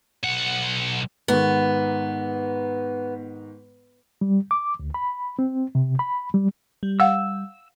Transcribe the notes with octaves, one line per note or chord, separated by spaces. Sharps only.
B1 F#5
G#2 D#3 B3
G3
D6
D2
B5
C4
C3
B5
G3
G3
F5 F#5 E6